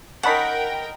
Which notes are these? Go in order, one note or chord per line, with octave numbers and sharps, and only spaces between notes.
C#4 D#4 A#4 F#5 G5 A5 B5 B6